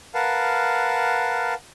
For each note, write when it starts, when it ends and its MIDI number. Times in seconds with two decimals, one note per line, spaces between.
0.14 1.54 70
0.14 1.54 71
0.14 1.54 77
0.14 1.54 78
0.14 1.54 81